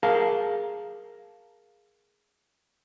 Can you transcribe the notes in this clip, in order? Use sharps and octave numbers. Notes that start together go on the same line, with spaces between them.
G#4 A#4 F5 A5